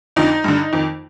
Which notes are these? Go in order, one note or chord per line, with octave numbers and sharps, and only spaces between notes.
F2 D3 D#4
G2 D3
F2 D#3